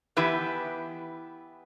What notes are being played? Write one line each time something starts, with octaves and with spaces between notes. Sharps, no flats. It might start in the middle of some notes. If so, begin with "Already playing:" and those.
E3 B3 E4 G4 B4